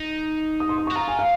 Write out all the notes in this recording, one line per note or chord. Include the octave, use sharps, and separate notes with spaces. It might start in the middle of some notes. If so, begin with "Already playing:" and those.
Already playing: D#4
D#6
C6
D#6
C#6
F#4
F4 A#5
G#5
F5